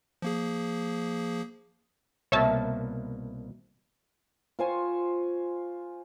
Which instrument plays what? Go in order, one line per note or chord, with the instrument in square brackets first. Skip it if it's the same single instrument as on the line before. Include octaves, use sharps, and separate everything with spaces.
[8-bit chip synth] F3 A#3 G#4
[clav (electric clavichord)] C2 B2 A#3 [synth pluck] C#5 E5 A5
[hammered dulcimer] F4 C5 G#5 C#6